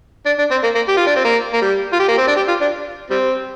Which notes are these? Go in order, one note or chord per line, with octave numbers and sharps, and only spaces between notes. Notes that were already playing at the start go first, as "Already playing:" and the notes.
D4
D4
C4
A#3
A#3
G4
F4
D4
C4
A#3
A#3
G3
F4
G4
A#3
C4
D4
G4
F4
D4
G3 C4